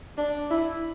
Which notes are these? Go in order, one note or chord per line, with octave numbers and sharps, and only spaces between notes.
D4
E4